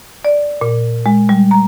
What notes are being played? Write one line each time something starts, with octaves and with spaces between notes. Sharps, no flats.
D5
A#2
G#3
G3
A#5